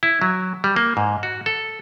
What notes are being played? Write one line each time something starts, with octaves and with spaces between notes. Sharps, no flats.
E4
F#3
G3
A#3
G#2
F#4
A4